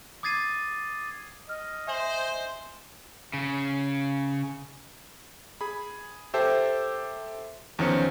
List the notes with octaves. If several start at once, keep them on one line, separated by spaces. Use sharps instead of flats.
D6 D#6 G#6 A6 C7 D#7
D#5 F6
C5 E5 G#5 F#7
C#3
G#4 B5
G4 A4 C5 E5 G5 A5
E2 D#3 F3 C#4 C5 C#7